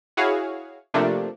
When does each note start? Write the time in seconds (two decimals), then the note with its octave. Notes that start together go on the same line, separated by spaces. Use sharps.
0.17 E4 F#4 G#4 C#5 F5
0.94 C3 F3 A3 A#3 D4